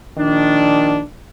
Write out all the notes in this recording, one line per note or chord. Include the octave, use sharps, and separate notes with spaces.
A#1 D#3 D4